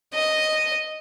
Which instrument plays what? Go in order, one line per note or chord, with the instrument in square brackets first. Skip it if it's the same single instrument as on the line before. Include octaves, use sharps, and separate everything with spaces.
[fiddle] D#5